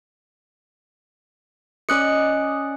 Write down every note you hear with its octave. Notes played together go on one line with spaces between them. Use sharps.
C#4 D5 D#5 F#6 C#7